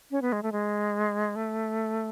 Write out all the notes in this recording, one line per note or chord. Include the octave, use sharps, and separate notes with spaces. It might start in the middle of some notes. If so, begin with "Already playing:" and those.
C#4
B3
G#3
A3
G#3
A3